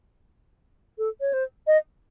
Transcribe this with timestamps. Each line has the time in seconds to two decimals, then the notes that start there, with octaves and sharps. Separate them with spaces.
0.98 A4
1.21 C#5
1.33 C5
1.67 D#5